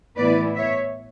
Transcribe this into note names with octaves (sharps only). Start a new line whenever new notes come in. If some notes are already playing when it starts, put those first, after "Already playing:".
A2 E3 B3 E4 B4 D5
C#5 E5